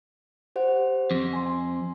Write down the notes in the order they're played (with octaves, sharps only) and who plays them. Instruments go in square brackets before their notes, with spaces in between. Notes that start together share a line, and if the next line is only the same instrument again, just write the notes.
[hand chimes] G4 C5 F#5
[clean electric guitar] F2
[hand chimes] G#5 C6